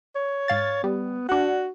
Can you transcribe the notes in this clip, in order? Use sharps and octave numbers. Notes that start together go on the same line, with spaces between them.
C#5
G#2 F5 A6
G3 B3
D4 F#4 F#5